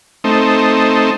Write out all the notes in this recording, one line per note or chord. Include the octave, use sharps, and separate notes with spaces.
A3 C4 D#4